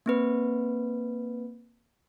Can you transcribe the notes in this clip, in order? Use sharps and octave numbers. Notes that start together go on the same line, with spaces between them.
A#3 C4 B4